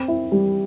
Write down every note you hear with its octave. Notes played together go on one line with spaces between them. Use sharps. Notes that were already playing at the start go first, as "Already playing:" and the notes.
Already playing: C4
E4
G3